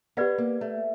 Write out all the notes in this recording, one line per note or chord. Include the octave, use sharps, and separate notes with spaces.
B3 G4 B4 D5 F#5
A#3
A3